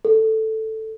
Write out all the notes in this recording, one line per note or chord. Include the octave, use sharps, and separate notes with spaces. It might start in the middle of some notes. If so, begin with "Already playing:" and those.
A4